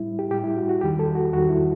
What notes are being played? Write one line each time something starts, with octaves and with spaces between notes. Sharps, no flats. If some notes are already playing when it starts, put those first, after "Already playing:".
Already playing: A2 G3 E4
G4
A2 G3 G4
E4
F#4
F#4
E2 D#3 G3 G4
A4
F#4
E2 D#3 G3 F#4
E4